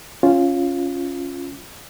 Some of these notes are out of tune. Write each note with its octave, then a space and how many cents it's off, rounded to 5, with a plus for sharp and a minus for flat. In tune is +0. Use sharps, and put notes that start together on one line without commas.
C#4 +0 F4 +0